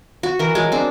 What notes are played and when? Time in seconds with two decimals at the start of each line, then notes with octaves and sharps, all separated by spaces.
0.23 F#4
0.39 E3 A#4
0.55 F#3 G#3
0.72 C4 D4